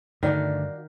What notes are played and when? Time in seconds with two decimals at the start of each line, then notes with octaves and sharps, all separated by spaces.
0.23 G2 D3 D#3 A3 F#4 D5 F5